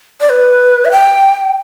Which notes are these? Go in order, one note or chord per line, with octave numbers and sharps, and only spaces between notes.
D5
B4
E5
G5